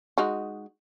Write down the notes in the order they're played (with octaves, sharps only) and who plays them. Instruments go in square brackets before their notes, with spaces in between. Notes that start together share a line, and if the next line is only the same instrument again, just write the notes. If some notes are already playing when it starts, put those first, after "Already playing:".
[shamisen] G#3 D#4 F#4